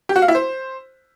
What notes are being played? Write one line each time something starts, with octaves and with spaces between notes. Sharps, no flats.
G4
F#4
F5
E4
C5